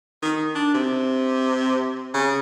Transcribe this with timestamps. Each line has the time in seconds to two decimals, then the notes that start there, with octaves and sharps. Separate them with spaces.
0.22 D#3
0.55 D4
0.74 C3
2.14 C#3